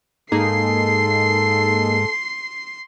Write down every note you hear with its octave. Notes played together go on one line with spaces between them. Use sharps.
G#2 A#3 D#4 G#4 A4 C6 C7